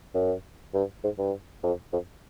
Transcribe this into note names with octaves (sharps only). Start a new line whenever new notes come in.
F#2
G2
G#2
G2
F2
F2